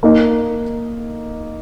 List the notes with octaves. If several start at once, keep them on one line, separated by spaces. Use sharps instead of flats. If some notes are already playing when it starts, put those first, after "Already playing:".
A#3 D#4 A#4 D#5